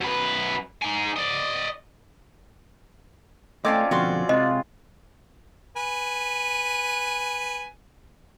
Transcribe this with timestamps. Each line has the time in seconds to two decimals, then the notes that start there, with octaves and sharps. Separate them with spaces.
0.01 F#2 B4
0.82 D#4 G#5
1.16 D5 D#5
3.65 A3 C4 C#4 F4 D5 D#5 A5 D6
3.91 F2 B2 D3 F#4 D5 C6
4.29 C3 G#3 F4 D#5
5.76 B4 G#5